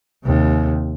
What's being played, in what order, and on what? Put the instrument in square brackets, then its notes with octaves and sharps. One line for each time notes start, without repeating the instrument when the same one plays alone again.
[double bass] D#2 C3